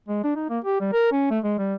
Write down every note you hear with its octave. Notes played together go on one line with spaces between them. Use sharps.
G#3
D4
D#4
A#3
G4
G3
A#4
C#4
A3
G#3
G3